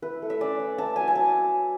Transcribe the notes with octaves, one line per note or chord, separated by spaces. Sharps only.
E4 B4
A3
E5
C#4 D5
E4
E4 A5
F#3 G#5
G#5
F#3 A5